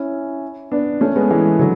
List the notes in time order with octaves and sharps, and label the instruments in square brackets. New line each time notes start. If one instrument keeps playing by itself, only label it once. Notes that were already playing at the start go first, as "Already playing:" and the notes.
Already playing: [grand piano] C#4 E4
B3 D4
A3 C#4
G#3 B3
E3 G#3
D3 F#3